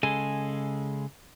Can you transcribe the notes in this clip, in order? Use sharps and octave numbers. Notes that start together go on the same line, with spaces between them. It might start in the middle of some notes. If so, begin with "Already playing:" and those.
C#3 G#3 A4 G#5